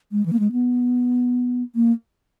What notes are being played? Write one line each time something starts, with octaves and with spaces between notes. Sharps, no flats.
G#3
E3
A#3
G#3
B3
A#3